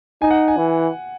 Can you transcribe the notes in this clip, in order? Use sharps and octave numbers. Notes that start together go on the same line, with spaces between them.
D#4 G#5
F#5
G#5
E3